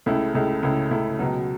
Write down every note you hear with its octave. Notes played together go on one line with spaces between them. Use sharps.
C#2 C#3 A3 E4
C#2 C#3 A3 E4
C#2 C#3 A3 E4
C#2 C#3 A3 E4
C#2 B2 F#3